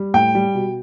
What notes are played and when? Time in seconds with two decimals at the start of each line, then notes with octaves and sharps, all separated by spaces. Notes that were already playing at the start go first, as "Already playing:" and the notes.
Already playing: G3
0.14 A2 G5
0.35 G3
0.55 B2